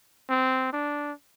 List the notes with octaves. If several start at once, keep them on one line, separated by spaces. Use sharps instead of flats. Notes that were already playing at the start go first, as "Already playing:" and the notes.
C4
D4